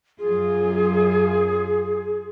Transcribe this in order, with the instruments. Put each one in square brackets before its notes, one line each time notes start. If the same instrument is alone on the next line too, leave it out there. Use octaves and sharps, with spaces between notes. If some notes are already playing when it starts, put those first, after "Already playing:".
[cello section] F#2 F4 [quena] G#4